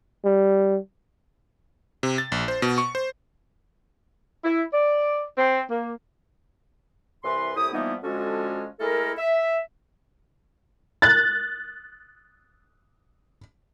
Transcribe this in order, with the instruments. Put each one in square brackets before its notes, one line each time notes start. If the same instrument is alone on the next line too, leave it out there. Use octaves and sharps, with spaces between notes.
[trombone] G3
[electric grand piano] C3
A6
A#1
C5
B2
C#6
C5
[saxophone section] E4
D5
C4
A#3
[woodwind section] C2 E3 B4 C6
C2 A2 E4 G4 D#6
E3 F3 G3 A#3 B3 D#4
D3 F3 G#3 C#4 F#4 A4
G#3 A3 E4 A4 A#4
E5
[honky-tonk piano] F#6 A6